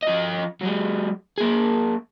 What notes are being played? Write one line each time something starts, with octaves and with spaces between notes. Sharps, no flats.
F3 D#5
F#3 G#3
A#3 G#4